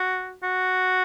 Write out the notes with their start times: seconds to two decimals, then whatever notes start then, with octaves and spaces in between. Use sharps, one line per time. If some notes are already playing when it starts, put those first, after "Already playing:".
Already playing: F#4
0.44 F#4